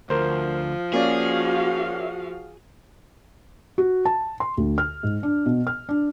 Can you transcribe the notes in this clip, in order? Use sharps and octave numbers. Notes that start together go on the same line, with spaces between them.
D2 F3 A#4 C5
A#3 C#4 F#4 G#4 D5 F5
F#4
A5
C6
D2
F6
G#2
D4
B2
F6
D4